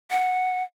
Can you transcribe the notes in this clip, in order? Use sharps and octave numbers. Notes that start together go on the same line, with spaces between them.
F#5